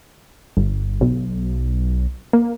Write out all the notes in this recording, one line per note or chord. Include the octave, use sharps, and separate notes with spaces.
G1
B1
A#3